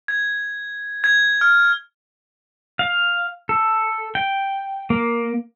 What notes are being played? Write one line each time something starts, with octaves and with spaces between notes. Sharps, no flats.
G#6
G#6
F6
F5
A4
G5
A#3